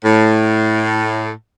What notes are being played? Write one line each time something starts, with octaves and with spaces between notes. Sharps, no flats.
A2